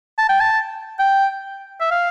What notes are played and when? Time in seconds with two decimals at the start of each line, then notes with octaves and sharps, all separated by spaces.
0.18 A5
0.29 G5
0.40 A5
0.99 G5
1.81 E5
1.91 F5